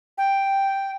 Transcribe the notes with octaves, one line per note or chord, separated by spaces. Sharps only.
G5